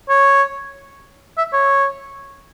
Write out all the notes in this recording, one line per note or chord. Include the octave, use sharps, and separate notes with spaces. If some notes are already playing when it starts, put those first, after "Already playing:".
C#5
E5
C#5